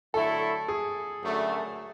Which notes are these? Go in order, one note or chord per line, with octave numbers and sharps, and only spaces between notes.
D3 F#3 A3 E4 A4
G#4
F#2 D3 A3